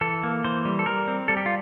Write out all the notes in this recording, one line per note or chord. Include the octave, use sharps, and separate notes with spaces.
E3 A4
A#3
E3 C5
G3
A4
G3 A#4
C4
G3 A4
G4
F4